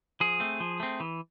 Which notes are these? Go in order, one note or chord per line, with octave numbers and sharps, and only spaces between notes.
F3 G#4
A3 C4
F3
A3 C4
E3